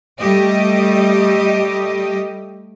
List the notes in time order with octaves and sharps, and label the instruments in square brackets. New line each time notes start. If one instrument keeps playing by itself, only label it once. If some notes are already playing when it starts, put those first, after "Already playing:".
[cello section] G3 A3 G4 D#5